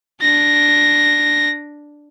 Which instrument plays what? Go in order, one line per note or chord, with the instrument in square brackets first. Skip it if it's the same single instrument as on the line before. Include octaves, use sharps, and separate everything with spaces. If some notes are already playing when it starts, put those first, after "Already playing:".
[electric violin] D4 A#6